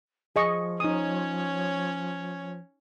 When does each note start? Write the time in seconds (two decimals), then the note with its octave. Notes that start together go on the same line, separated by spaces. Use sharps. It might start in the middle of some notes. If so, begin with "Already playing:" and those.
0.36 F3 G#4 D#5 C#6
0.80 C#4 D#4 C#5 D#6